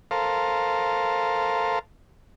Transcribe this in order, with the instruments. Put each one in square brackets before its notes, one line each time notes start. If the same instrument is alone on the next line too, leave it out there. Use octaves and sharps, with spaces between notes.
[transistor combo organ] A4 A#4 C5 F5